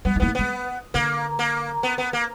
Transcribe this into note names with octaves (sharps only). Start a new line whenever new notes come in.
G3 B3
G#3
A#3 B3
A3
G#3 B3
D3 A#3
A#3
B3
B3
A#3